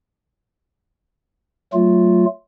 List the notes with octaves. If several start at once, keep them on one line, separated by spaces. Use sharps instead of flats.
F#3 A3 F4